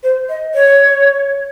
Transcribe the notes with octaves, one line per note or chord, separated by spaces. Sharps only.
C5
D#5
C#5